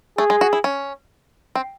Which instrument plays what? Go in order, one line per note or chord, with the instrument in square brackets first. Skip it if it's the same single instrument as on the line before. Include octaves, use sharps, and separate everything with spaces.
[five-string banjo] A3 [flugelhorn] G#4
[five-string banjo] G#3
F#4
E4
C#4
C4